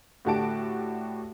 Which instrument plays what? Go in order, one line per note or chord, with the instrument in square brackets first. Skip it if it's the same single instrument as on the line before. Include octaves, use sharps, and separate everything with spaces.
[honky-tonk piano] A2 D3 F#4 G4 A5 D7